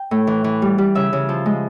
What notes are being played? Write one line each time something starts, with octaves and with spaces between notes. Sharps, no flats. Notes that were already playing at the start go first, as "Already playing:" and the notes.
Already playing: G5
A2
E3
E3
G3
G3
C#3 E5
C#3
F3
G#3